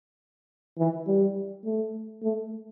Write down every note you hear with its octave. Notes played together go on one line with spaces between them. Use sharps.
E3
G3
A3
A3